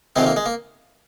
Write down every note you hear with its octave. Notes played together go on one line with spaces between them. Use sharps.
F2 C3 D#3 F#3 G#3 C4
A#3
G#3
A#3